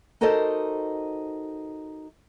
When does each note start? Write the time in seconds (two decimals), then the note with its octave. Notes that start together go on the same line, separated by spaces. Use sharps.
0.21 D#4 F#4 A4 A#4 C5 D#5